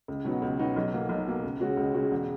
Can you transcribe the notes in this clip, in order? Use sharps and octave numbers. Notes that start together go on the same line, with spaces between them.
C#2
B2 F#3 B3 D#4
C#2
B2 F#3 B3 D#4
B1
B2 A#3
B1
B2 A#3
C#2
C#3 G#3 C#4 F#4
C#2
C#3 G#3 C#4 F#4
E1